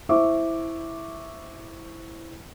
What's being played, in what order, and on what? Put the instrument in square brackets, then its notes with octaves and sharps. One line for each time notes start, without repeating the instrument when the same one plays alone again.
[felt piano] E4 C5 E5 C#6 D6